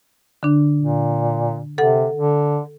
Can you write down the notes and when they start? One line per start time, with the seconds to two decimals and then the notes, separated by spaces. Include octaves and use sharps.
0.43 D3 D4
0.79 A#2
1.78 C3 A4 F#5
2.16 D3